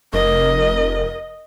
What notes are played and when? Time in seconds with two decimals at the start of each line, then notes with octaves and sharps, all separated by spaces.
0.13 F1 A#4 D#5